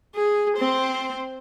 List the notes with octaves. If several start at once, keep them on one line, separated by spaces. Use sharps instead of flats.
G#4
C4 C5